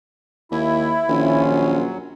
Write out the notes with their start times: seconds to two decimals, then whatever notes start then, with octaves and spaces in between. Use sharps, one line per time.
0.52 D#2 E4
1.09 A#1 D#3 C#4 F4
1.43 F#3